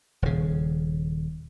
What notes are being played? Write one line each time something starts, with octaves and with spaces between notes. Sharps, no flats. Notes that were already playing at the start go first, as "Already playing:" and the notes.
D#1 C#3